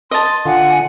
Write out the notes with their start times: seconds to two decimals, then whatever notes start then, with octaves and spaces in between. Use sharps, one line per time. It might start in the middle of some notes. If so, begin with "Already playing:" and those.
0.11 D#5 A5 C6
0.45 D3 F4 F#5 G#5